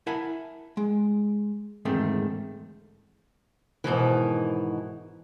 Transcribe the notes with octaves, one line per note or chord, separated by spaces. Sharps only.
E4 A#4 E5 F#5 G#5 A5
G#3
E2 G#2 D3 D#3 A3 C4
G#2 B2 D#3 E3